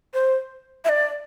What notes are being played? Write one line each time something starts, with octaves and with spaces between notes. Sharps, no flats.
C5
E5
D5